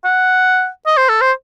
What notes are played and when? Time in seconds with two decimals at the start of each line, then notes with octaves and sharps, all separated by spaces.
0.04 F#5
0.86 D#5
0.97 C5
1.09 A4
1.21 C5